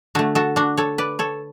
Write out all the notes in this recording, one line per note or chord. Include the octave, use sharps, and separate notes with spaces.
D3 A3 F#4 A4
F#4 A4
D4 F#4
A4 C#5
B4 D5
A4 C#5